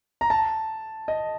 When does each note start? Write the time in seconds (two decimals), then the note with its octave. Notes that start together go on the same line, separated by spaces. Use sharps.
0.21 A#5
0.30 A5
1.08 D#5